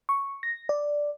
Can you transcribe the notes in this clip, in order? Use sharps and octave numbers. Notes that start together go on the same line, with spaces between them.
C#6
A#6
D5